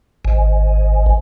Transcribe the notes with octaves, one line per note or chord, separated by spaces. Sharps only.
G#1